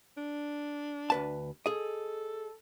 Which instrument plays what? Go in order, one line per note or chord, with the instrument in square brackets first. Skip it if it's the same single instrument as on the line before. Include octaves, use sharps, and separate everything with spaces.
[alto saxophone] D4
[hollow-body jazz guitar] D2 B4 A5
[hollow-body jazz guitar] G#4 D#5 [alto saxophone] A4